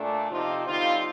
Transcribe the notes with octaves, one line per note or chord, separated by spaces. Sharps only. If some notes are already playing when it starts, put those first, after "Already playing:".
Already playing: A#2 A3 D4
C3 F3 C4 D#4 F4
D3 G3 C4 D#4 F4